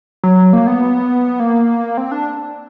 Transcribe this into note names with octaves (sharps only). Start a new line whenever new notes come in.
F#3
A#3
B3
A#3
C4
D4